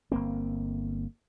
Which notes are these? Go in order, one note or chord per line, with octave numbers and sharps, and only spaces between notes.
G1 A#3 C4